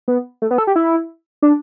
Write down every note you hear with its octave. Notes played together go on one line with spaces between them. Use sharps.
B3
A3
B3
A4
G4
E4
D4